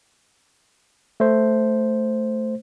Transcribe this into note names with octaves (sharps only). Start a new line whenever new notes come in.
A3 C5